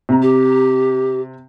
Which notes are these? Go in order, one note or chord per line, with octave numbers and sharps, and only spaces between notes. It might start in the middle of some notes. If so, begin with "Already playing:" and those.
C3 A#5
G4